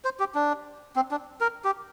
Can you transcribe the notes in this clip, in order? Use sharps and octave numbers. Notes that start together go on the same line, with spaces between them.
C5
G4
D4
C4
D4
A#4
G4